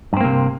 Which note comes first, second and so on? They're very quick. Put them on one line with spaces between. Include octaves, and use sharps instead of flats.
G2 C4 A#3 C3